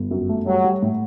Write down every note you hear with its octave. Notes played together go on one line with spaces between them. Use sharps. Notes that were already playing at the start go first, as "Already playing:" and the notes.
Already playing: G1
F#2
A3
F#3 G3
G3
A2